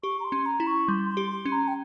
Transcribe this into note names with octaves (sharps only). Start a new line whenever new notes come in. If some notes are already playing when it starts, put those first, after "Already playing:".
G4 C#6
A#5
C6
C#4
A#5
E4
C#6
G3 C6
C6
G4
C6
C#4
A#5
G5